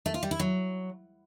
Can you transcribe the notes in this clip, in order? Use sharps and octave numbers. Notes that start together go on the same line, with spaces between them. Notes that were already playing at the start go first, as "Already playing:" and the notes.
A3
F4
G3
E4
F#3